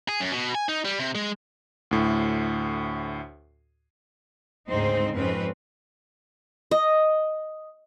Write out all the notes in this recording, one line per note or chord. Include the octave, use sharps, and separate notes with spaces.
G#4
F#2
B2
G#5
D#4
G3
C3
G#3
D2 A2
D2 G#2 C#3 C4 D#4 C5
F2 G#2 C4 C#4 B4
D#5